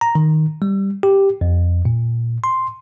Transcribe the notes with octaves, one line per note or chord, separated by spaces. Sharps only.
A#5
D#3
G3
G4
F2
A#2
C6